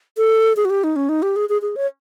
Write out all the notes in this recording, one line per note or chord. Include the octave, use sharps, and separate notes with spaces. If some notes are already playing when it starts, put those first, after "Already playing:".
A4
G#4
F#4
G4
D#4
C#4
D#4
G4
G#4
G#4
G#4
C#5